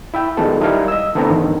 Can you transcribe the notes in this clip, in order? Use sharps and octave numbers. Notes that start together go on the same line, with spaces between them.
E4 E5 G5
D#3 G3 G#3 B3 F4 A4
G3 D#4 E4 A#4 F5 G#6
D#5 E6
D3 A3 B3 C4 E4 A#5
E2 G2 D#3